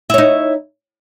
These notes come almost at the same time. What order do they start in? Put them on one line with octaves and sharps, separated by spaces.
E4 C#5 D#4